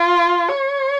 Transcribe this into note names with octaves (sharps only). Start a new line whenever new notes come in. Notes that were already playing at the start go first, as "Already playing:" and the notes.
Already playing: F4
C#5